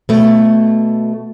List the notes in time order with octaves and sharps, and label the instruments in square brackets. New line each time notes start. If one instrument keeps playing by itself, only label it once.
[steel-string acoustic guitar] B2 A3